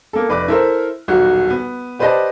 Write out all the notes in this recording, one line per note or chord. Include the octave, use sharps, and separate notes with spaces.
A#3 A4
F1 B4 D5 D6
E4 A4 A#4 C5 E5
D#1 B1 F#4
B3
G4 B4 C5 D5 D#5 A5